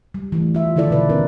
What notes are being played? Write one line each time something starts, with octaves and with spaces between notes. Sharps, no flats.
G3
E3 A3
F4 E5
D3 D#3 E4 A4 D5
B2 B4
B3 C#4 D#4 A#4